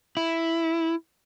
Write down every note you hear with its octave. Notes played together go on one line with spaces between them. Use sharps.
E4